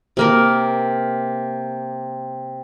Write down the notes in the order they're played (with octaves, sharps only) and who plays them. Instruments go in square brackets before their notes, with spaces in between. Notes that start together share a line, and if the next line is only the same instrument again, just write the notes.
[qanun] C3 A#3 A#4